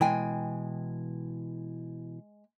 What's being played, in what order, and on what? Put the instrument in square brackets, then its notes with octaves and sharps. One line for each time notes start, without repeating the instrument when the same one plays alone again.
[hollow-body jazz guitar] B2 E3 [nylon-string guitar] G#3 G5 G#5